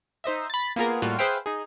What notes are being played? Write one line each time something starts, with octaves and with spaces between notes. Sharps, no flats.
D#4 C5 D#5 E5
B5 A6
A#3 B3 F4 G#4 A#4
A2 G3 A#3 F4 F#4 A4
G#4 B4 C5 E5 F5 G5
D#4 G#4